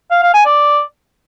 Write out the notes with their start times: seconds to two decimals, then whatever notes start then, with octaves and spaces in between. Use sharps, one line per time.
0.11 F5
0.22 F5
0.34 G#5
0.45 D5